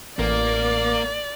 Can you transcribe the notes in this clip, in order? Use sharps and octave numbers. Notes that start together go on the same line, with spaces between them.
A1 A#3 D5